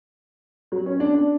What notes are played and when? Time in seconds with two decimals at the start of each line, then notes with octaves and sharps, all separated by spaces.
0.72 F#3
0.86 C#4
1.00 D4
1.14 D4